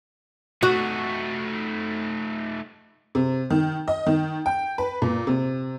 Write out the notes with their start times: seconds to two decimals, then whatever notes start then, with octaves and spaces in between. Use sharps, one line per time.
0.63 A3 D#4 F#4
3.15 C3
3.50 D#3
3.88 D#5
4.07 D#3
4.46 G5
4.78 B4
5.02 A#2
5.27 C3